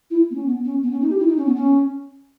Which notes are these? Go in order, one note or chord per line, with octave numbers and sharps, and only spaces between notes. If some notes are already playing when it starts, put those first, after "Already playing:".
E4
B3
C#4
B3
C#4
B3
C#4
D#4
G4
E4
D#4
C#4
B3
C#4